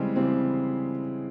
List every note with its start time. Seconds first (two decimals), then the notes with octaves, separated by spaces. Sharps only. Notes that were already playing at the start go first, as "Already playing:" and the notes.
Already playing: C#3 E3 G3 G#3 C4
0.16 C#3 E3 G3 C4